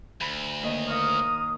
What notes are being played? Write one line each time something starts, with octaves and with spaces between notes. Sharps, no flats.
D2 B5
D#2 D#5
A#4 F5 A#5 C#6 D#6